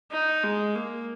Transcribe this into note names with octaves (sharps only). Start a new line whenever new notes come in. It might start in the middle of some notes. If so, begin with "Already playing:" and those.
D#4
G#3
A#3